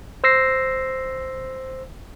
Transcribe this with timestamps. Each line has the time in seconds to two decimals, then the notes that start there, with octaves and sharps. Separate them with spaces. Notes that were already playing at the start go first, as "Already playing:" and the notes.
0.24 C5 E6 A#6 C7